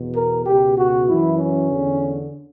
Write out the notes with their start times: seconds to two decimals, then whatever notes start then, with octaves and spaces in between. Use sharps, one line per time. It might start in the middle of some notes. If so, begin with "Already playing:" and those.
Already playing: E2 B2
0.15 A#4
0.46 C#2 B2 G4
0.78 F#4
1.08 F#2 E3 E4
1.38 C#4
1.70 E2 D3